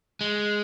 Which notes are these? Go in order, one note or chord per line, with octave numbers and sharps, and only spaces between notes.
G#3